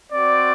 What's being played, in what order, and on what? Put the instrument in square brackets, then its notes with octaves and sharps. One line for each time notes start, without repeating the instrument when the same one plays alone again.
[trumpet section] C4 F#4 D5